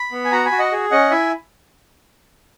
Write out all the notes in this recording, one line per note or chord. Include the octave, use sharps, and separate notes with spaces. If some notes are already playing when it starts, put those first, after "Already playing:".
Already playing: B5
B3
G#5
F#4 F#5 A#5
G#5 B5
F#4
D#5 F#5
G#4
C#4 D#5 F#5
E4 E5 G#5